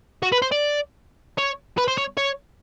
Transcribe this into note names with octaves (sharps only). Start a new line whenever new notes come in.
F#4
B4
C5
D5
C#5
B4
C5
C#5
C#5